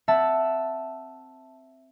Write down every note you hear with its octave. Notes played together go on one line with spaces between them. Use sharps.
C4 E5 F#5 A5